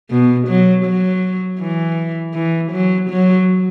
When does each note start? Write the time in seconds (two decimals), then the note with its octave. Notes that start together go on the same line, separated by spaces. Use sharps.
0.10 B2
0.48 F#3
0.85 F#3
1.60 E3
2.34 E3
2.72 F#3
3.09 F#3